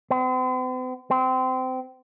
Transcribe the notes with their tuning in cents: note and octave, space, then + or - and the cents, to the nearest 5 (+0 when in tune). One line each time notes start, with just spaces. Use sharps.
C4 -45
C4 -25